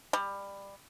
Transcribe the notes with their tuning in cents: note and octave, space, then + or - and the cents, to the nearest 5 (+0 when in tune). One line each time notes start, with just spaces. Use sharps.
G3 +20